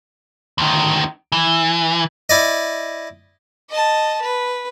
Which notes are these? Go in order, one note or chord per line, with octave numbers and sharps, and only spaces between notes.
D2 D#3
E3
E4 D5 D#5
D#5 A5
B4